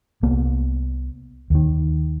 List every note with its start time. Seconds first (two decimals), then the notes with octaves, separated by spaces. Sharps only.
0.23 C2 A#3 B3
1.50 D#2 D#3